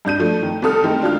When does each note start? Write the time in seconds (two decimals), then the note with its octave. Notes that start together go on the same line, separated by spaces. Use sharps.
0.05 G2 D4 G6 D#7
0.20 F3 A3
0.43 D#3
0.62 C2 C4 A4 D#6 F6
0.84 D#3 G#3 A3 C4
1.02 D4 F4 F6